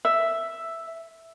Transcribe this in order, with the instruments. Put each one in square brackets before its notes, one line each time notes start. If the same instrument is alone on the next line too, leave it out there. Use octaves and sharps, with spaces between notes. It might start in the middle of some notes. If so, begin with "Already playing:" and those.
[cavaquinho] E5